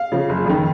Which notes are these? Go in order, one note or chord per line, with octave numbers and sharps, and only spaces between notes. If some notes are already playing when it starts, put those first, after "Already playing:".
Already playing: F5
C#3 F3
F#1
F2 D#3